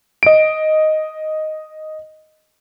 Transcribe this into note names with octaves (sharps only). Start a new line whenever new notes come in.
D#5 D7